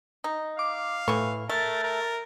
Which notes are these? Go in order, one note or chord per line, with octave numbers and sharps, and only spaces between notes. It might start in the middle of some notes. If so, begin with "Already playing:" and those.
D#4
F5 D6
A2 E3 C#6
A3 A#4 A6
A#4